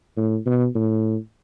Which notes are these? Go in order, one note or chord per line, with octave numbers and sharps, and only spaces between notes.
A2
B2
A2